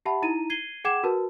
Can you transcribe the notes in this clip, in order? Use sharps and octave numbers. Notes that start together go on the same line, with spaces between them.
G4 E5 F#5 A5 B5
D#4 E4 A#5 D#7
G#6 C7 D#7 G7
G#4 F#5 G5 D6 G#6 E7
F#4 A#4 B4 A5